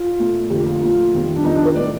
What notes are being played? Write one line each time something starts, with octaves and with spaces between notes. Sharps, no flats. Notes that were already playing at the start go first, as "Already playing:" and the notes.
Already playing: F4
A#2 A3
F2 D3 F3 A3 G4
F4
A#2 F3 A3 F4
F2 D#3 G3
D4
F2 D#3 G3 D#4
D4
A#4
A2 A3 D5